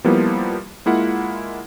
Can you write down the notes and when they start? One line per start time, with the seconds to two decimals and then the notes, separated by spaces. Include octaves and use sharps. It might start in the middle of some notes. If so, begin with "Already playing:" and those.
0.04 F3 G3 A#3 B3 E4
0.86 G#3 A#3 E4 F4 F#5